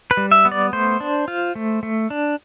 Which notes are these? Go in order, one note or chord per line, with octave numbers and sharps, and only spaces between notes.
B4
G3
E5
B3
D5
A3 C5
D4
F4
A3
A3
D4